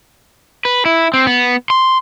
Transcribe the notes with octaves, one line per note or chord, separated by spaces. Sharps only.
B4
E4
C4
B3
C6